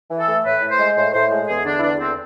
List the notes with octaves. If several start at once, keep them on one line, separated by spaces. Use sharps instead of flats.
E3
A4
A3
A2 B4
A2
C5
G#3
A2 C5
A2 C5
G#3
E2 G#4
D3 D4
E4
E2 D4
D3 C4